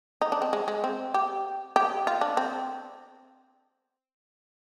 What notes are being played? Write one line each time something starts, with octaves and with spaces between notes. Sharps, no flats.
D#4
D4
C4
G#3
G#3
C4
G4
G4
F4
D4
C4